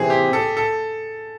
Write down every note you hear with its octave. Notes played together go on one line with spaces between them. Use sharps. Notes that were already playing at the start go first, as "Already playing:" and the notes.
Already playing: C3 E3 C4 G#4
G4
A4
A4